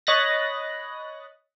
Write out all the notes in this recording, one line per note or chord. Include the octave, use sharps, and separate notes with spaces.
C#5 D#5 B5 F#6 A6 A#6